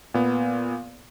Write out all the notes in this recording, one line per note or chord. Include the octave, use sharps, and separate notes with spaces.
A#2 B3